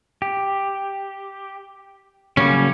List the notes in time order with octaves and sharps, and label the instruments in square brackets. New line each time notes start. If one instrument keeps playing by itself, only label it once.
[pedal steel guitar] G4
[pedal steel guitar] C#3 F#3 A#3 [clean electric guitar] G3 C#4